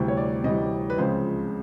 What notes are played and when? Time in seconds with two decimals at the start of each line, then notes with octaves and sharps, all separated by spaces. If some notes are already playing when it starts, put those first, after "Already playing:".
Already playing: D2 C3 E3 G3
0.08 C#5
0.17 D5
0.44 D2 C3 E3 G3 D#5
0.90 B4
0.98 C#2 C#3 F3 G#3 C4 C5